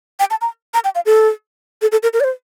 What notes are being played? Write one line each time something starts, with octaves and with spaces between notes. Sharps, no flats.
G5
A5
A#5
A#5
G5
F5
A4
A4
A4
A#4
A#4
D5
C5